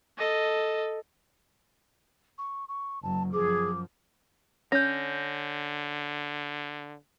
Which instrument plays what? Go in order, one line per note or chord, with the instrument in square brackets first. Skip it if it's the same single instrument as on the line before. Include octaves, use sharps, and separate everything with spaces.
[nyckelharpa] A4 D#5
[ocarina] C#6
C#6
[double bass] F#1 F#3 [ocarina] A5
[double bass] F#2 F3 [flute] G#4 [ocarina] D6
[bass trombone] D3 [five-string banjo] C#4 [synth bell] G6 A#6